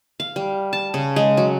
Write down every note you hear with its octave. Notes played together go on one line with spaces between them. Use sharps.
F5
G3
A5
C#3
G#3
F#3